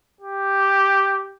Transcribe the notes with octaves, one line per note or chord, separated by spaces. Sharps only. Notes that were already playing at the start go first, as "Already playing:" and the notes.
G4